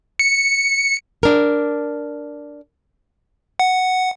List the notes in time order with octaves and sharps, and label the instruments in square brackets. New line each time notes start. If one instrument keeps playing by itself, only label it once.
[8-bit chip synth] C#7
[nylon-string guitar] D4 A#4
[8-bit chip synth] F#5